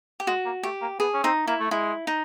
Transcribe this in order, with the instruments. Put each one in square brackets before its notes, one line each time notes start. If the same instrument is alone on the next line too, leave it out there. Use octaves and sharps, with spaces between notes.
[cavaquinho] G4
[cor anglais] G#3 [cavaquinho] F#4
[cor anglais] A#3
[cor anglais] A3 [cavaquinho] G4
[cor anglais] A#3
[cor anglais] B3 [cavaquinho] G#4
[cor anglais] C#4
[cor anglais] C4 [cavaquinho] D#4
[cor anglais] A#3 [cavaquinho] E4
[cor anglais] A3
[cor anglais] G#3 [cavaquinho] E4
[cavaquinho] D#4